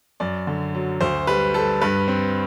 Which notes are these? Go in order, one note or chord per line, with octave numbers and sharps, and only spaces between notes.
F#2 D5
D3
F#3
D2 C5
G3 B4
G3 A4
G2 B4
C4